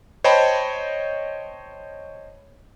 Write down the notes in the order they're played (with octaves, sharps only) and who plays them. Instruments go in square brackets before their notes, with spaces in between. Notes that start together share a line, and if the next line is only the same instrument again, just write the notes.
[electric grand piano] C5 C#5 D#5 G5 A5 B5